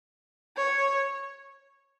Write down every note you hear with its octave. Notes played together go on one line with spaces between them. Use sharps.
C#5